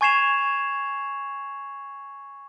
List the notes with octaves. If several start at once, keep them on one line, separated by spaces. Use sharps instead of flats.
G#5 C#6 G#6 C7 E7 F7